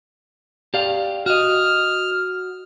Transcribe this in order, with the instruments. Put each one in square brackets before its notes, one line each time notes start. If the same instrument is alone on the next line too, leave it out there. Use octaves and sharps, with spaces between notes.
[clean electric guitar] G4 D5 F5
[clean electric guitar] F#4 D#5 [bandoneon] F6